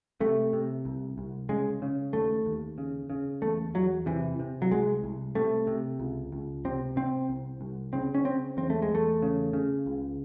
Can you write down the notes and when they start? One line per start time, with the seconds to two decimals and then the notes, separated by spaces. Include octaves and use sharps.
0.20 C3 A3
0.53 C3
0.85 C2
1.18 C2
1.49 C#3 G#3
1.82 C#3
2.13 D#2 A3
2.46 D#2
2.78 C#3
3.10 C#3
3.42 E2 A3
3.74 E2 F#3
4.06 C3 E3
4.39 C3
4.62 F#3
4.71 C2 G#3
5.04 C2
5.35 C3 A3
5.67 C3
6.00 C#2
6.32 C#2
6.65 C3 C4
6.96 C3 C4
7.29 C2
7.61 C2
7.93 C#3 C4
8.15 C#4
8.25 C#3 C4
8.57 E2 C4
8.70 A3
8.82 G#3
8.90 E2
8.95 A3
9.22 C#3
9.53 C#3
9.86 C#2